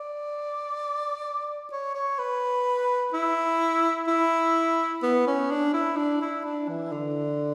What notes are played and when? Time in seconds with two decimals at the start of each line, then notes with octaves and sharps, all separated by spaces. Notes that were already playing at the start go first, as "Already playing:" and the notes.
Already playing: D5
1.72 C#5
1.95 C#5
2.19 B4
3.14 E4
4.08 E4
5.03 B3
5.27 C#4
5.51 D4
5.74 E4
5.97 D4
6.22 E4
6.44 D4
6.69 E3
6.92 D3